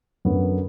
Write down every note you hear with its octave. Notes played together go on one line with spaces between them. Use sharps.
F#2 D3 F#3 B3